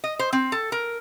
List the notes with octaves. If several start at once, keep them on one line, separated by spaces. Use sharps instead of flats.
D#5
C5
C4
A4
A#4